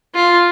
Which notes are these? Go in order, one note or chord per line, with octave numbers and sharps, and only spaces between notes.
F4